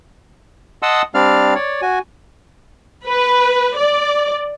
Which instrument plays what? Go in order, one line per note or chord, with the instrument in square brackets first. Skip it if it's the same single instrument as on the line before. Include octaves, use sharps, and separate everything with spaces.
[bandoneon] D#5 F#5 A5 C6 D#6 E6
G3 C4 D4 D5 F5 F6
C#5 D5
F#4 G#5
[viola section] B4
D5